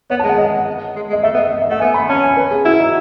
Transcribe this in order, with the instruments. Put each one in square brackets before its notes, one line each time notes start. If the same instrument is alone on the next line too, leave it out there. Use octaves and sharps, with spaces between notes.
[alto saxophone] B3 [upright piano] C#5
[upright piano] A5
[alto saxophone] G#3
[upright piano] F#5
D#5
[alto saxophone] G#3
G#3
[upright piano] D#5
[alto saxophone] A3 [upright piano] E5
[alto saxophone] B3
[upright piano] D#5
D#5
E5
[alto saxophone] A3 [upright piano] F#5
[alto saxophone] B3 [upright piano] G#5
[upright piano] B5
[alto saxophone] C#4 [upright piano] A5
[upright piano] G#5
B4
G#4
[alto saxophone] E4 [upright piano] F#4
[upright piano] D#4